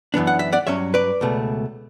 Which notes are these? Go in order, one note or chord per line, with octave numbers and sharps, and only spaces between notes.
F#2 E3 B3 D4
F#5
E5
D5 F#5
G2 F#3 C#4 C#5 E5
B4 D5
C#2 B2 A3